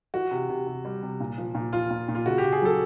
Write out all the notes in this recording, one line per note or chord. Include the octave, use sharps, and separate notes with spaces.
E3 F#4
C3
C3
C3
G3
C3
A#2
F3
A#2
F3 F4
A#2
A#2
F4
C#3 F#4
G4
C#3
G#4
F#3 A4